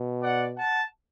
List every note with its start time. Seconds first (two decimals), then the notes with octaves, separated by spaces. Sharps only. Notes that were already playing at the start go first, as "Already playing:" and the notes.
Already playing: B2
0.20 D5 F#5
0.55 F#5 A5